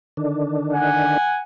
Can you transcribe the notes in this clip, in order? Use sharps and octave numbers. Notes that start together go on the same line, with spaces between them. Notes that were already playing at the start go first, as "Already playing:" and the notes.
D3 D#3 D4
F#5 G#5